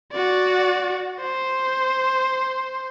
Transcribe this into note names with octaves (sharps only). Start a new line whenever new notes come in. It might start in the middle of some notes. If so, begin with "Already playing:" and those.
F#4 D5
C5